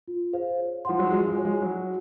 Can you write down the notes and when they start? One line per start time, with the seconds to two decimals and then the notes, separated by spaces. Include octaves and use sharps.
0.08 F4
0.33 G#4 C5 F5
0.59 C#5
0.85 F3 F#5 C6
0.99 F#3
1.10 F3 G#3 F#4
1.27 F3 G#3
1.36 C#5 G#5
1.45 F3 G#3
1.61 F#3 F#4